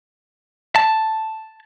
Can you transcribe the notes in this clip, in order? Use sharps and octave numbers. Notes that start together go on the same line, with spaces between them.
A5